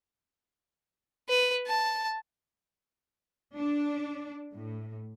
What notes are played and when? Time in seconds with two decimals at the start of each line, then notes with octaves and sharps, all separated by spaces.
1.29 B4
1.67 A5
3.57 D4
4.54 A2